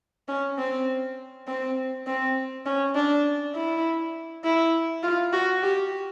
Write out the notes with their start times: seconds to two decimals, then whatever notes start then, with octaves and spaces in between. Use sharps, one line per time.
0.28 C#4
0.58 C4
1.47 C4
2.07 C4
2.66 C#4
2.96 D4
3.55 E4
4.44 E4
5.03 F4
5.33 F#4
5.63 G4